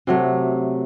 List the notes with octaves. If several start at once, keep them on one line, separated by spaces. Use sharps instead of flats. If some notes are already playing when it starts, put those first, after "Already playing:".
C3 F#3 A3